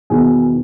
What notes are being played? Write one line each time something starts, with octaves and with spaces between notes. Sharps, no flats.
E1 E2 D#3 F#3 B3 G#4 G#5